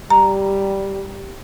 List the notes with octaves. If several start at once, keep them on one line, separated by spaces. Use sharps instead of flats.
G3 A#5